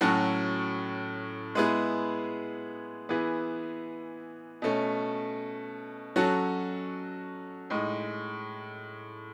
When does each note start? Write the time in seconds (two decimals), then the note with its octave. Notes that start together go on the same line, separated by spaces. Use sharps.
0.01 A2 F#3 C#4 F#4 A4
1.55 G#3 B3 E4 G#4
3.09 E3 B3 E4 G#4
4.62 B2 A3 C#4
6.16 F#3 C#4 F#4 A4
7.70 A2 G#3 D#4